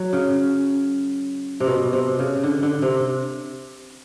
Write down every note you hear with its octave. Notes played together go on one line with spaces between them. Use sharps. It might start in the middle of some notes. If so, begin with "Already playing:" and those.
Already playing: F#3
C#3
C3
B2
C3
C#3
D3
D3
C3